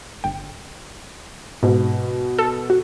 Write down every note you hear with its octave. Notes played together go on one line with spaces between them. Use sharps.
G1 G5
G#2 B2
A4
F#4